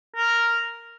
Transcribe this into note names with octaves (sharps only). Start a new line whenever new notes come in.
A#4